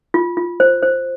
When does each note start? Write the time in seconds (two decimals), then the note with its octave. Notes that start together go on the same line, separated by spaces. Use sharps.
0.14 F4
0.37 F4
0.60 C5
0.83 C5